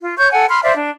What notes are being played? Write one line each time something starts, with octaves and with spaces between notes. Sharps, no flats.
F4
C#5 C#6 G6
A4 F#5 G#5
B5 C6 F6
C5 D5 E5 F5
D4